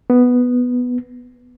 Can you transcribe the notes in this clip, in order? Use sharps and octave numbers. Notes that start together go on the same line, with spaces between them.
B3